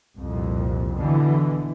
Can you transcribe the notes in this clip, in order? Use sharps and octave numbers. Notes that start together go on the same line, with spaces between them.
C2 F2 A#2
B2 D3 E3